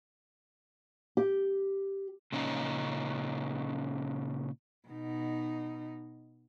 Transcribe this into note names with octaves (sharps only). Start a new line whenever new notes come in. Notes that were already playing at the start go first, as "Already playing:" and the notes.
G4
A#2 C#3 C#4 D#4
B2 D#4